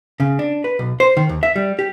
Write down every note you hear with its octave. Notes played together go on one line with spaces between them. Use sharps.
C#3
D4
B4
B1
C5
D#3
D#2
E5
G3
G4